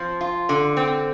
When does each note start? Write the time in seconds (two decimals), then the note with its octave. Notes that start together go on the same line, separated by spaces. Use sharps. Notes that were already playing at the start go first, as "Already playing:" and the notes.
Already playing: F3 C4
0.21 F4
0.49 D3
0.77 C4